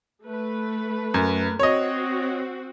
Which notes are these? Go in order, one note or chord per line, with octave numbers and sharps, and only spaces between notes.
A3 B4
F#2
C4 F#4 C#5 D#5